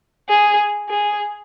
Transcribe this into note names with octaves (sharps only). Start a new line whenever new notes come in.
G#4
G#4